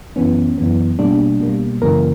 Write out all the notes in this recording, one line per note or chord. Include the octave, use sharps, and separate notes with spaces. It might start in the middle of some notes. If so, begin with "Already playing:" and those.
F#2 E3 B3 C#4
F#2 E3 B3
B2 G3 A#3 D4
B2 G3 A#3
F#2 C#3 E3 A#3 A#4